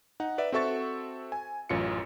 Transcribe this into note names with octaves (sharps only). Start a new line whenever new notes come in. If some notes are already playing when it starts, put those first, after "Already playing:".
D#4 F#5
B4 D5 E5
C4 F#4 A4 E5 C#6 A6
G#5
A1 F#2 F4 C#7